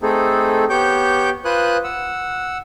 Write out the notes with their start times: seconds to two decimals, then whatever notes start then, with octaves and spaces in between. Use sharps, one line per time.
0.02 A3 C4 D#4 G#4 A4
0.70 B3 G4 C#5 G5 D6 G6
1.45 F4 B4 C5 G#5 D#6 F#6
1.84 F#5 E6